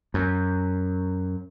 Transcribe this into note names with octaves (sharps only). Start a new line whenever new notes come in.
F#2